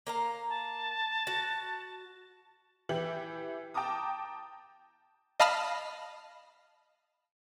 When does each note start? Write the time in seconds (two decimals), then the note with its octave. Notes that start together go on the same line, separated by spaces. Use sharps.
0.07 A#3 F5 A#5
0.49 A5
1.27 F#4
2.89 E3 E4 G4 F#7
3.74 G5 A5 A#5 D6 D#6
5.40 D#5 F5 A5 B5 D#6 F6